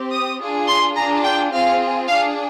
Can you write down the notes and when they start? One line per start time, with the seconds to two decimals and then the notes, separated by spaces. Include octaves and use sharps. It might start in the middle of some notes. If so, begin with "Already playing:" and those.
Already playing: C4 G4
0.12 D#6
0.40 D4 F4 G#4
0.67 C6
0.95 D4 F4 G#4 A#5
1.24 G5
1.52 C4 F4 G#4 F5
2.08 D4 G#4 F5